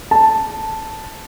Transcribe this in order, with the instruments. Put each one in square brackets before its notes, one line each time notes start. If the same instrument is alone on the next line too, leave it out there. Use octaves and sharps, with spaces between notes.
[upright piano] A5